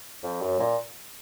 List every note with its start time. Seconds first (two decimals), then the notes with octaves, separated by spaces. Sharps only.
0.23 F2
0.42 F#2
0.60 A#2